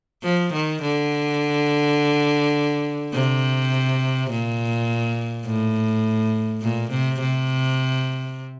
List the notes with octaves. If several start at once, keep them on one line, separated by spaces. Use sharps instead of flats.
F3
D#3
D3
C3
A#2
A2
A#2
C3
C3